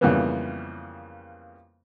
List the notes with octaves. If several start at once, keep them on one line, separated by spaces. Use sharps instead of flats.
F2 C#3 E3 G3 A#3 B3